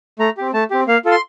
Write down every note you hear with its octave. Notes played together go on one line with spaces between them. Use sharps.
A3 A#5
C4 G4
A3 A5
C4 G4
A#3 F5
F4 A4
C6